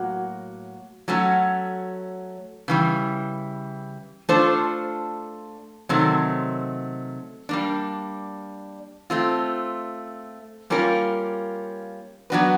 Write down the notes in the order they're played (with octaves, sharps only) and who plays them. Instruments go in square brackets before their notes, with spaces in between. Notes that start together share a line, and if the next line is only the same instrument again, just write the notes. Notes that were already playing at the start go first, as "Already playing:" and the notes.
Already playing: [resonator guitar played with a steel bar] A2 F#3 A#3 F#4
F#3 A3 C#4 F#4
C#3 E3 G3
A3 D4 F4 A4 C5
C3 D#3 F#3 A3 C4
G3 A#3 D4
A3 C4 F4
G3 A#3 C#4 F4 A#4
F#3 B3 D4 F#4 B4